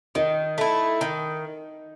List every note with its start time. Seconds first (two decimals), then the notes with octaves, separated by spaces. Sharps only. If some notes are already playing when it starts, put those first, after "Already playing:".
0.15 D#3 D#4
0.58 A3 E4
1.01 D#3